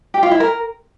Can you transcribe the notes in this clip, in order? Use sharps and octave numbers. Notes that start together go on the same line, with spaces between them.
G4
F4
E4
A#4